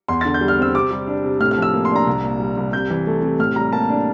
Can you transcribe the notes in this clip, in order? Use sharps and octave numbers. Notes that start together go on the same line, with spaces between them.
E2 C6
D3 A6
G6
G3
F6
C4 E6
C3 D6
G3
D4
C3
A2 F6
F6
F3
E6
A#3
C6
D4 A#5
C2
A#2
G3
C2
C3 G6
E3
A3
C3
A2 F6
G3 A#5
A#3 A5
D4